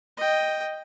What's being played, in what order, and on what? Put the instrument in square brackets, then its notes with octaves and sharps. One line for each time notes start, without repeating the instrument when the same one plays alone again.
[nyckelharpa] D#5 G5